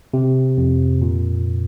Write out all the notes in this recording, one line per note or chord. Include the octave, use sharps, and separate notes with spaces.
C3
F2
A#2